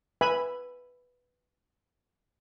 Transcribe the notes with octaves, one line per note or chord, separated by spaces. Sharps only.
B4 E5 G#5 B5